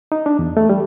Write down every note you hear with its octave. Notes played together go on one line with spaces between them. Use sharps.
D#4
D4
E2
A3
G3